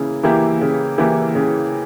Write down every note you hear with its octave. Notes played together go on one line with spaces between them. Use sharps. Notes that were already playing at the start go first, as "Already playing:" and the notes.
Already playing: C#3 E3 A#3 E4
E3 A#3 E4 G4
C#3
E3 A#3 E4 G4
C#3